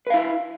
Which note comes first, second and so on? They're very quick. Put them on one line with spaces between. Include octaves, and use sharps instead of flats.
B4 F5 E4